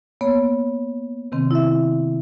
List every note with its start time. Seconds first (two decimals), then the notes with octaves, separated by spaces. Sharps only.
0.21 A#3 B3 C#5
1.32 C3 D#3 C4
1.51 E4 E5